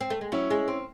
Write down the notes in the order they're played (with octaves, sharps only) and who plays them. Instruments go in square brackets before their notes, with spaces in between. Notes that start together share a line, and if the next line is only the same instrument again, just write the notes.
[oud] C4
A3
G#3
[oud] F#3 [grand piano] C#4 E4
[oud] G#3
C4